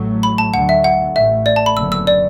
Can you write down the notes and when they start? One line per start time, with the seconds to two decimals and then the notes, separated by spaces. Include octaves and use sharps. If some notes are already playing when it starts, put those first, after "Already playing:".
Already playing: A1 A2 F#3 A3
0.23 B5
0.38 A5
0.54 D2 D3 F#3 F#5
0.69 E5
0.84 F#5
1.15 A1 A2 A3 E5
1.46 D5
1.56 A5
1.66 B5
1.77 F#1 F#2 D3 B3 E6
1.92 E6
2.07 D5